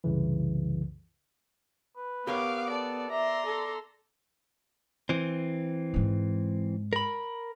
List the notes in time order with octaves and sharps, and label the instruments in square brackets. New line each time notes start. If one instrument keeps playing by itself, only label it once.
[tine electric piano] C2 F#2 C#3 E3
[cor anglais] B4
[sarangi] B3 [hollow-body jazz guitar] G4 A#4 C#5 [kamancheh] F5 D6
[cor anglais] A4 [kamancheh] D5
[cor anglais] D5 [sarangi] E5 [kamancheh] A#5 C6
[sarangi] A4
[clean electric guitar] E3 C4
[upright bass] G#2 G#3
[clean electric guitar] A#4 B5